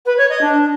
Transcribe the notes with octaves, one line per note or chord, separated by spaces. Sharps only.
B4
C#5
D#5
D4